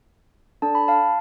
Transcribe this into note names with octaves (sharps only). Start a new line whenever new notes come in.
D4 A4 A5
B5
F5 A5